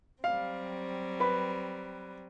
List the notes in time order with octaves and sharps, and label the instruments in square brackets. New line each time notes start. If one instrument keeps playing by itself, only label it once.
[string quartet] F#3 G3 C4 [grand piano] F5
[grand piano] B4 B5